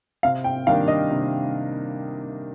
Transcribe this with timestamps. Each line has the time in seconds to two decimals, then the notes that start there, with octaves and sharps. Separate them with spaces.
0.23 C3 F5
0.44 G5
0.67 D#3 G3 A#3 D4 F5
0.88 D#5
1.10 C3